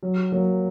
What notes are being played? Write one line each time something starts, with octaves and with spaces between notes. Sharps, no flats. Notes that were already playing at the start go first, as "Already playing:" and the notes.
F#3
F#3 A#3